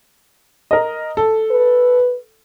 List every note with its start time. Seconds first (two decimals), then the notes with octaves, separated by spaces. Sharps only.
0.71 A#4 D#5
1.17 A4
1.51 B4